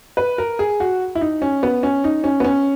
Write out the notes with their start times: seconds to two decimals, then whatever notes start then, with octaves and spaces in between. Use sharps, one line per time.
0.17 B4
0.38 A#4
0.59 G#4
0.80 F#4
1.15 E4
1.21 D#4
1.42 C#4
1.63 B3
1.83 C#4
2.04 D#4
2.24 C#4
2.40 B3
2.44 C#4